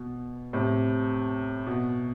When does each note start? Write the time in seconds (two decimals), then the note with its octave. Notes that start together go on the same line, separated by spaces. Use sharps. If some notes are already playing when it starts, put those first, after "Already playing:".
Already playing: B2
0.53 A2 C3
1.67 B2